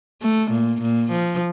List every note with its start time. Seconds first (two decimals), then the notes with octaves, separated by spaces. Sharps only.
0.22 A3
0.51 A#2
0.82 A#2
1.12 F3